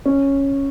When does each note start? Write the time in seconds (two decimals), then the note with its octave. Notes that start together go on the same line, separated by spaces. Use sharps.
0.06 C#4